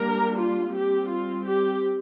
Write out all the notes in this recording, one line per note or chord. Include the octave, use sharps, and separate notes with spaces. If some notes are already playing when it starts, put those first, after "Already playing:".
Already playing: G3 A#3 D4 A#4
F4
G3 C4 G4
F4
G4